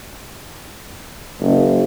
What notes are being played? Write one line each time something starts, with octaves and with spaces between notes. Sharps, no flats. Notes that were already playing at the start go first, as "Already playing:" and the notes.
F#1